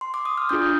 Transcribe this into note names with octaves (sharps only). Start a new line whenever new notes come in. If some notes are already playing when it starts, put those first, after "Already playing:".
C6
D6
D#6
F6
D4 F4 G#4 D#6 G6